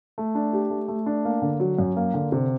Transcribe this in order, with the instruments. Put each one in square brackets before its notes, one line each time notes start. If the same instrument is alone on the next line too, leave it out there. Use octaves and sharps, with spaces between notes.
[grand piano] A3
D4
G4
A3
A3
D4
A#3
D3
F#3
F#2
A#3
D3
C3